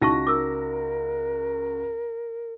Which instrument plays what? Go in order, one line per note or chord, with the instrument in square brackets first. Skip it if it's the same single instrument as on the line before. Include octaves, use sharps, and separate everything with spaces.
[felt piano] C#2 F#4 A#6 [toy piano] D#4 A5 C#6 [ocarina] E4
[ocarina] A#4 [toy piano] D6 E6